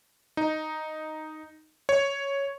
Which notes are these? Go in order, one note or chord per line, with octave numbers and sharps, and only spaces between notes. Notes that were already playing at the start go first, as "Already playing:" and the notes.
D#4
C#5